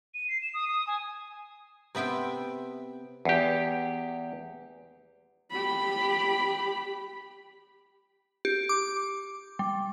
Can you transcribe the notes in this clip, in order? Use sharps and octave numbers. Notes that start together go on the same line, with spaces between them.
D#7
C7
E7
D#6
D#6
G#5
C3 B3 E5 G5 C6
E2 G4
G4 B5
G4
D6
G3